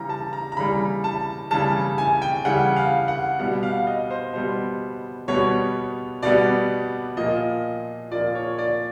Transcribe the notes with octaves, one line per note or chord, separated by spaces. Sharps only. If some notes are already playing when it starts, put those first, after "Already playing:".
Already playing: C#3 E3 G3 A#5
A5
A#5
A#5
C#3 E3 G3 B5
A5
C#3 E3 G3 A5
G#5
G5
C#3 E3 G3 F#5
F5
F#5
B2 G3 B3 F#5
F5
D#5
C5
B2 G3 B3 C5
B2 G3 B3 C#5
B2 G3 B3 D5
A#2 F3 A#3 D#5
A#2 F3 A#3 D5
C#5
D5